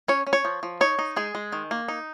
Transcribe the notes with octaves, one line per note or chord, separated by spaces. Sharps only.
C#4 C#5
C#4
C#5
F3
F3
D#4 C#5
D#4
G#3 G#4
G#3
D#3
A#3
D#4